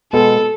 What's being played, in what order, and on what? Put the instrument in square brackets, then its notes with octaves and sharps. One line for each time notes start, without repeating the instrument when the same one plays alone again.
[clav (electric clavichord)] B2 G#3 B3 [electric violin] A4